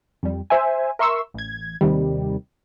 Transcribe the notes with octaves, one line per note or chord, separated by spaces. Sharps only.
F2 G3
C5 E5 G#5
A#4 E5 C6 C#6 E6
A1 G#6
D#2 C3 D#3 G3